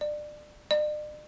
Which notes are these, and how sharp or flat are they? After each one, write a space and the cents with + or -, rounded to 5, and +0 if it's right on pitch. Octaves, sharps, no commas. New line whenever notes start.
D5 +25
D5 +45